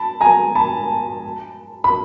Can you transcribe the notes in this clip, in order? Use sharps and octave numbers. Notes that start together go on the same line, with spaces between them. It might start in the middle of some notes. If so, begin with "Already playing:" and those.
Already playing: A5 B5
G#5 A#5
A5 B5
B5